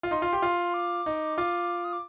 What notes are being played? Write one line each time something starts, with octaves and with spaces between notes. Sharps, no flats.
F4
D#4 C6
F4
G4
F4
D6
D#4
F4 D6
D#6
D6